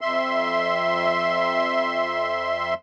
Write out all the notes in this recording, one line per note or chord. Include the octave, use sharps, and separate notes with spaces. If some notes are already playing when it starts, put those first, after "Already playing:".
F2 E5 C6